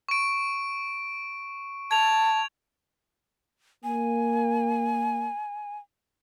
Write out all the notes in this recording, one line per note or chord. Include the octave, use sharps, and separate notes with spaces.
C#6 D7
A5 G#6 F7
A#3 G#5